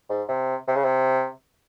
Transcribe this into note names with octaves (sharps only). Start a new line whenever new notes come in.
G#2
C3
C3
C#3
C3